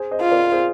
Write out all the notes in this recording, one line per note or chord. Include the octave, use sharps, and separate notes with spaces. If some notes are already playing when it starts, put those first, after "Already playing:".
Already playing: G#4 C5
C5 D#5
F4
A#4 D5
G#4 C5